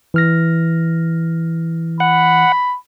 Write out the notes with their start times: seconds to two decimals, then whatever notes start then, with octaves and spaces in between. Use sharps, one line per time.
0.14 E3 F6 A#6
2.00 F#5 B5